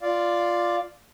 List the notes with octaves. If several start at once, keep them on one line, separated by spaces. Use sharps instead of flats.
F4 D5 F5